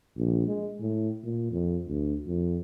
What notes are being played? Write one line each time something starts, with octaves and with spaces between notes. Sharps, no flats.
A#1
G#3
A2
A#2
F2
D2
F2